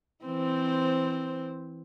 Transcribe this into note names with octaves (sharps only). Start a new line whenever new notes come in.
E3 C4 C5